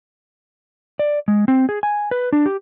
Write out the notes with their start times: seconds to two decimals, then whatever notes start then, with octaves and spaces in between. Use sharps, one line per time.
0.99 D5
1.28 G#3
1.48 C4
1.69 G#4
1.83 G#5
2.11 B4
2.33 D4
2.46 G4